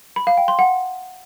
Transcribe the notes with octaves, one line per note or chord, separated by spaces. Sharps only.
B5
F5
G5
C6
F#5